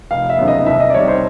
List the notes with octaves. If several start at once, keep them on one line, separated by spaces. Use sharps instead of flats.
F1 F5
E5
D#2 C#3 F#3 B3
D#5
C2 E5
D#5
D5
C3 D#3 G3 C#5
C5